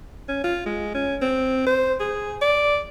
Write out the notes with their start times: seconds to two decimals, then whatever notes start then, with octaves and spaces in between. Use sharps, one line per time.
0.28 C#4
0.44 F4
0.66 G#3
0.94 C#4
1.22 C4
1.66 C5
2.00 G#4
2.42 D5